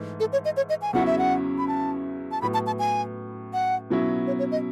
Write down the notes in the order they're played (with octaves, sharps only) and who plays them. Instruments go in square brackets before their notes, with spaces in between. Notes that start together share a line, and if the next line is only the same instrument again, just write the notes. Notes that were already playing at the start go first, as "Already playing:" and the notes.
Already playing: [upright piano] G#2 E3 A3 D#4
[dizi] A4
C#5
D#5
C#5
D#5
G#5
[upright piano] E2 C#3 F#3 C#4 E4 [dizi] F#5
[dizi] E5
F#5
B5
A5
A5
[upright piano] A2 F#3 B3 [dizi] B5
[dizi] A5
A5
G#5
F#5
[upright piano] B2 F#3 C#4 E4
[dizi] C#5
C#5
D#5